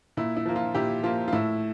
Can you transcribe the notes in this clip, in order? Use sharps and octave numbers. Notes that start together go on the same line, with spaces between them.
A#2 E4
E4
F3 A#3
F4
A#2 E4 G4
F3 A#3 F4
F4
A2 E4